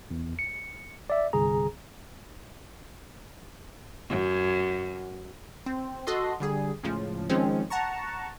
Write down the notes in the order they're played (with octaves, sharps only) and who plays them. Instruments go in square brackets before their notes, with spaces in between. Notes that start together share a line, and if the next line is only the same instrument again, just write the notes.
[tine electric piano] E2
C#7
D5 E5
G1 C2 G#4 A#5
[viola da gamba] F#2
[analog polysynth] C4
F#4 A4 D#5 C6
D3 G3 G#4
C#2 A2 C#3 F3
D#3 F3 G#3 C4 C#4
F#5 A5 A#5 C#6